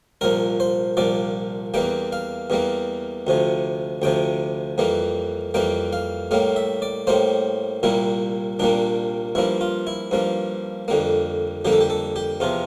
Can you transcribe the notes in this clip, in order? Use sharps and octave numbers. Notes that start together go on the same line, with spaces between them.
C2 A#2 F3 A#4
C5
C2 A#2 F3 D5
E2 E3 G3 A#3 G5
F5
E2 E3 G3 A#3
D2 C3 F3
D2 C3 F3 G5
F2 E3 G3 A#3
F2 E3 G3 A#3 G5
F5
A2 G3 A#3 F5
E5
D5
A2 G3 A#3 C5
C2 A#2 G3 A#3 E4
C2 A#2 G3 A#3 D4
G2 F3 A#3 E4
F4
E4
G2 F3 A#3
F2 D3 G3 A#3
F2 D3 G3 A#3 G4
A4
G4
A4
G4
E2 C3 F3 F4